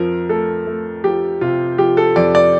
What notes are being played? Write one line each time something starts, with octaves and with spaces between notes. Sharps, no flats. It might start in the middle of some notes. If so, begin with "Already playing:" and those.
Already playing: F2 F3 A#4
A3 A4
A3
F3 G4
C3 F4
F3 G4
A4
F2 D5
D5